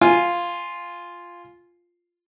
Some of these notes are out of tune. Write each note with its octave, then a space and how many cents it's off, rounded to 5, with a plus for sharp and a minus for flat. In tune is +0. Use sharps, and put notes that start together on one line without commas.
F4 +0 F5 +0 G#5 +0